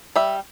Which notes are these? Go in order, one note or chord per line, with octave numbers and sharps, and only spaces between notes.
G3 E5